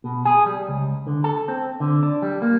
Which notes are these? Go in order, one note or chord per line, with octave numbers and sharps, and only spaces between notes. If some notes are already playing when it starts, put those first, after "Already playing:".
B2
G#4
G3
C#2
D3
A4
C4
D3
D4
G3
A#3